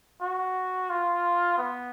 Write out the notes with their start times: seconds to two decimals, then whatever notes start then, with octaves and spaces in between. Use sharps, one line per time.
0.21 F#4
0.90 F4
1.58 B3